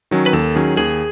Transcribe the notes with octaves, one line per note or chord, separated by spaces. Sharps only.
D#3 F#3 C#4
B4
D#2 A4
D#3 F#3 C#4 G#4
D#2 G#4